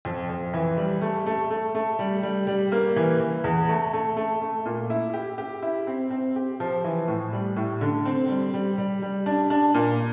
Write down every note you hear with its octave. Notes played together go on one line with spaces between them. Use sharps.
F2
F2
E3
G3
A3
A3
A3
A3
G3
G3
G3
A#3
E3
E3
E2
A3
A3
A3
A3
A#2
E4
G4
G4
E4
C4
C4
G4
F3
E3
A2
G3
A2
D3
C4
G3
G3
G3
G3
D4
D4
A#2